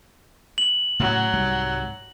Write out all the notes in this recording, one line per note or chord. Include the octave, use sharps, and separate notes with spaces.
F#7
A2 C#3 F#3
C2 G#2 G3